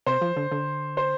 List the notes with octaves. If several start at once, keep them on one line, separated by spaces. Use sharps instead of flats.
C3 C5
F3
D3
D3
C5